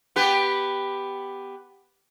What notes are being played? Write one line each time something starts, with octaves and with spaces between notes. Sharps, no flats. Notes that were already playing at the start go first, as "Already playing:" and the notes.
B3 G4 B4